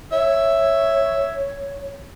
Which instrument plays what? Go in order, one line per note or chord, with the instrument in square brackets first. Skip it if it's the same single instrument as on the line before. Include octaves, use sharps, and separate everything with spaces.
[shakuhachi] C#5 [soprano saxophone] E5